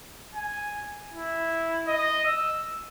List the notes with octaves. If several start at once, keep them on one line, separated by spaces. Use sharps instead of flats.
G#5
E4
D#5
E6